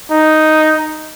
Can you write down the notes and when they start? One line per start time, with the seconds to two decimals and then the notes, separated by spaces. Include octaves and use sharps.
0.12 D#4